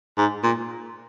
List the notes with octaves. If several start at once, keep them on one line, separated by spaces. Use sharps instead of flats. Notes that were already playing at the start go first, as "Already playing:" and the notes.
G#2
A#2